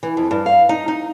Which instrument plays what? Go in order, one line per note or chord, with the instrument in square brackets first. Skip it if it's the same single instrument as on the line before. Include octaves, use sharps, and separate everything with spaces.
[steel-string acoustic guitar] E3
F2
G2
F5
D#4
D#4